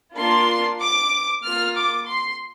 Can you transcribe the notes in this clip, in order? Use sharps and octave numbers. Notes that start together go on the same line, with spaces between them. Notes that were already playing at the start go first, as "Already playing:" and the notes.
A#3 D4 F4 C6
D6
A#3 F4 F6
D6
C6